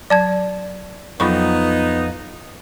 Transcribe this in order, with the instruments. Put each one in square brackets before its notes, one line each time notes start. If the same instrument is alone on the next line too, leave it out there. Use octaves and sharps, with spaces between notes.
[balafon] F#3 [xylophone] D5 A5 G#6
[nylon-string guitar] F2 [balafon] F#3 B5 C#6 [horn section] B3 D#4